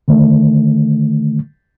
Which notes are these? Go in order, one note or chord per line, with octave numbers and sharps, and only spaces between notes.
D3 D#3 A3